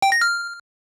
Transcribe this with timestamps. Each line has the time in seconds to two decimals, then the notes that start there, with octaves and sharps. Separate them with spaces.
0.02 G5
0.12 A#6
0.21 F6